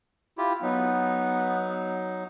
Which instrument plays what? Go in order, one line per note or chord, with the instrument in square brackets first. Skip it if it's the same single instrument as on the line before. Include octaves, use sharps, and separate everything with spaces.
[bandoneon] E4 F4 G4
[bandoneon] F#3 D#4 [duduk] B3